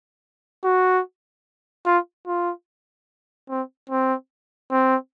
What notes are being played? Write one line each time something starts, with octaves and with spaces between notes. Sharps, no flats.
F#4
F4
F4
C4
C4
C4